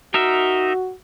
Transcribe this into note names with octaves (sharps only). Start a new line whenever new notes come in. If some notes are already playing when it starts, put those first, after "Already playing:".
D#4 F#4 A#4 E5